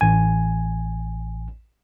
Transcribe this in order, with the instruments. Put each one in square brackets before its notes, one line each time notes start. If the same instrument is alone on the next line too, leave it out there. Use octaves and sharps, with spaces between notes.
[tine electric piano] A1 G#5